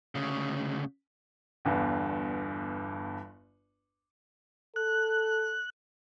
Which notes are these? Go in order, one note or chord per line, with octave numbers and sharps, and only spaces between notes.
D2 C#3
G1 E2 G2
A4 F#6